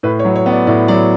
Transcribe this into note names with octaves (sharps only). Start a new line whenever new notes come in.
A2 B4
C#5
F#3
C#5
B3
D5
A2 D5
F#3 D5